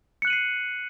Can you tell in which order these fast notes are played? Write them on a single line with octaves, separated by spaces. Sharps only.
C#7 F#6 F#7 D#7 C7